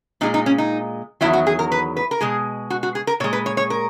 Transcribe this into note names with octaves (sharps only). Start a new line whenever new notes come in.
A#2 G#3 D#4
D#4
C#4
D#4
E2 D#3 F#3 E4
F#4
G#4
A#4
B4
B4
A#4
B2 G#3 G#4
F#4
F#4
G#4
A#4
A#2 G#3 C#5
B4
C#5
C#5
A#4